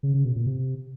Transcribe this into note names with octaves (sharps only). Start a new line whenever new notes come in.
C#3
C#3
B2
A#2
C3